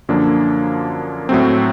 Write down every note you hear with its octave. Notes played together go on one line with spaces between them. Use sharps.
F#2 D3 F3 A#3 D4
A2 F#3 A3 C4